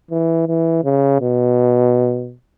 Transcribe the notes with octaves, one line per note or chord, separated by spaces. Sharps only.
E3
E3
C#3
B2